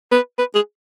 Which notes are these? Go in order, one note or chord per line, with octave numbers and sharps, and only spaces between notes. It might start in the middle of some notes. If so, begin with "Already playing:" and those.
B4
B4
G#4